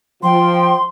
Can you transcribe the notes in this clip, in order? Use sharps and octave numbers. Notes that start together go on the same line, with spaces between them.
F3 G5 C6